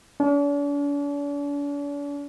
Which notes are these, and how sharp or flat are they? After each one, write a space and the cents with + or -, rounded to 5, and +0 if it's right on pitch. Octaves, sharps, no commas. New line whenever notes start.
D4 -45